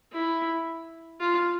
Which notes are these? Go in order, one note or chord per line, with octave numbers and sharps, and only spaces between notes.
E4
F4